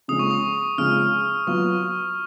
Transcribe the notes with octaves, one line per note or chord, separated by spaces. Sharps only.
C#3 F3 G#3 C#4 D#6
C#6
D#6
C#3 F3 G#3 C#4 F6
F#3 B3 F4 C#6